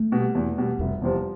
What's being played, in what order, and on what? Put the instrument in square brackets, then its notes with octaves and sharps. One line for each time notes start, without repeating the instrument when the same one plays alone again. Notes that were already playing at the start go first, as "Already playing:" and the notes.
Already playing: [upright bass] A3
[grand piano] B2 G3
E2
B2 G3
[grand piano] F1 [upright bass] G3
[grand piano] E2 C3 F3